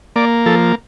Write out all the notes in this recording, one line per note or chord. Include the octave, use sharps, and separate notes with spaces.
A#3 D5
F3 A4